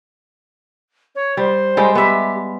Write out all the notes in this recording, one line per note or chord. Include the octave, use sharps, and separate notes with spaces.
C#5
G3 C5
G3 G#3 G5
B3 G4 E5